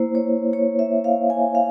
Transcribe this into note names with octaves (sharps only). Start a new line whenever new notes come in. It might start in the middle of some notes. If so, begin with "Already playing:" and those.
Already playing: A#3 E4 C5
C#5
C#5
E5
F5
G#5
F5